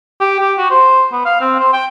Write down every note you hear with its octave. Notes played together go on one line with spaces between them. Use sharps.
G4
G4
F#4
C5
B3
F5
C4
C5
G5